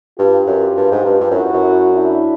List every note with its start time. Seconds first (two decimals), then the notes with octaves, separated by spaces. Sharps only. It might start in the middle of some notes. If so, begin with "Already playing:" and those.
0.18 G2 F4 G4
0.47 F#2
0.76 G2
0.91 G#2
1.05 G2
1.20 G2
1.31 F#2 E4 F#4
1.53 F#2
1.92 D4 E4